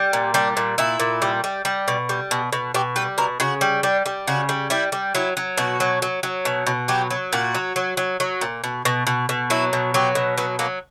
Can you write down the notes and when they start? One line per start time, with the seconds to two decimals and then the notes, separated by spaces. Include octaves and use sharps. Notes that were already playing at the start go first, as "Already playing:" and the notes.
Already playing: G3
0.13 A#2
0.34 G3 D4
0.57 A#2
0.78 A#2 E4
1.00 A#2
1.22 G3
1.44 G3
1.65 G3
1.88 B2
2.09 G3
2.31 B2
2.53 B2
2.74 B2 G4
2.96 G3 B4
3.18 B2 A#4
3.40 C#3 F#4
3.61 G3
3.83 G3 D4
4.06 G3
4.27 C#3 F#4
4.49 G3
4.70 G3 E4
4.92 G3
5.15 F#3 E4
5.37 F#3
5.57 B2 F#4
5.80 F#3
6.02 F#3
6.23 F#3
6.45 B2
6.67 B2
6.88 F#3 G4
7.10 F#3
7.33 A#2 F#4
7.55 F#3
7.76 F#3
7.97 F#3
8.20 F#3
8.41 A#2
8.64 B2
8.85 B2
9.07 B2
9.29 B2
9.50 F#3 E4
9.73 B2
9.94 F#3 G4
10.15 B2
10.38 F#3 B3
10.59 F#3 A#3